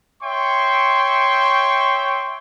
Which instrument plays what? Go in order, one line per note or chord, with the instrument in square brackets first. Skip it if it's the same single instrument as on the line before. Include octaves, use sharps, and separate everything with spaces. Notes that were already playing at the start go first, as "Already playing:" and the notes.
[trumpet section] C#5 E5 G5 C6 C#6